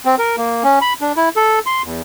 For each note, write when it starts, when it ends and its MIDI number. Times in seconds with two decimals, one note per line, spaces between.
0.05 0.15 60
0.18 0.36 70
0.37 0.63 58
0.63 0.79 61
0.81 0.93 83
1.01 1.12 62
1.16 1.29 64
1.36 1.59 69
1.66 1.82 84
1.84 2.02 40